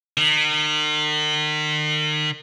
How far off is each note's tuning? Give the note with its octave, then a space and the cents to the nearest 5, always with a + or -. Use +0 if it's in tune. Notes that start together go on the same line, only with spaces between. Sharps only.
D#3 -40